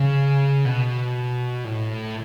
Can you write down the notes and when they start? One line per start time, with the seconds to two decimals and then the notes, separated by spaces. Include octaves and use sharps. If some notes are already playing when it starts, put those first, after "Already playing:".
Already playing: C#3
0.66 B2
1.65 A2